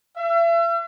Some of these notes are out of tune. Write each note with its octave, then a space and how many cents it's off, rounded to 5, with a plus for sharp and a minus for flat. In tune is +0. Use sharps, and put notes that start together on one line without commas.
E5 +40